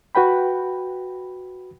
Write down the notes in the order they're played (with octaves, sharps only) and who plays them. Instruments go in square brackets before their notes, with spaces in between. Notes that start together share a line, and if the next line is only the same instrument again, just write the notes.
[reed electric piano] F#4 B4 G5 B5